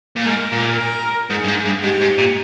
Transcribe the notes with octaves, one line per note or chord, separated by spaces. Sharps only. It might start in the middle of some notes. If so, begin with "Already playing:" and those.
A#2
G#2 A#4
A#2
A#4
G#2 G#4
G2
G#2
G2
G#2 G4
G#2
A#2